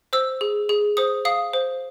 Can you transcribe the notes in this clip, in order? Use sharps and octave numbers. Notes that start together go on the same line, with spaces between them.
C5 E6
G#4
G#4
C5 D#6
F5 D#6
C5